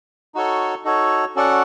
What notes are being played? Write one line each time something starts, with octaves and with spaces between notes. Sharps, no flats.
D#4 F#4 A4 C#5
D#4 F#4 A4 C#5
C#4 F#4 A4 D5 F#5